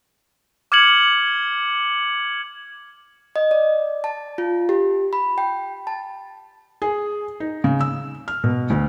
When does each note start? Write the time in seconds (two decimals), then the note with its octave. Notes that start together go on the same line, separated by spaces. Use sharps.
0.72 D6 F6 G#6 C#7 F#7
3.36 D#5
3.51 D5
4.04 A5
4.38 F4
4.69 G4
5.13 B5
5.38 G5
5.87 A5
6.82 G#4
7.40 D#4
7.64 C#3
7.81 E6
8.28 F6
8.44 B2
8.70 D2